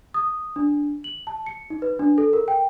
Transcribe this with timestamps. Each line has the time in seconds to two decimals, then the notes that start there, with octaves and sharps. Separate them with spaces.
0.14 D#6
0.56 D4
1.04 F#7
1.27 A5
1.46 C#7
1.70 D#4
1.82 B4
1.99 D4
2.18 A4
2.33 A#4
2.48 G5